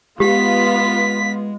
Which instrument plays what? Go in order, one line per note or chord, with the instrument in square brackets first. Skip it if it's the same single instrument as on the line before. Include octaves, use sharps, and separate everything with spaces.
[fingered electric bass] G#3 [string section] B3 F4 [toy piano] G4 [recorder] B6